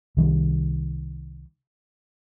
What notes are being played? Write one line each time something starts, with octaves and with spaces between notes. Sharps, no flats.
C2 D#3 G3